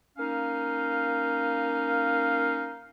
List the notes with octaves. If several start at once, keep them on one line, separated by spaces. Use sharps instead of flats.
A#3 C#4 D#4 F5